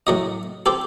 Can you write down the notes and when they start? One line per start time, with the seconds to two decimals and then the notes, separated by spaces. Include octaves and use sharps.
0.07 A2 F#3 D#5
0.66 C4 G4 A4